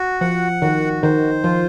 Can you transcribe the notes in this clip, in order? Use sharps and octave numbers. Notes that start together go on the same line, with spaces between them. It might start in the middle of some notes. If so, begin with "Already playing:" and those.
Already playing: F#4
F3 F#5
D#3 F#4
D#3 C5
F3 F4